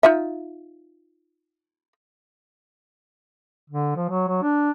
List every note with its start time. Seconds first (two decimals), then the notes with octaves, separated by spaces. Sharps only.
0.03 D#4 F4 E5
3.70 D3
3.96 F3
4.09 F#3
4.27 F#3
4.42 D4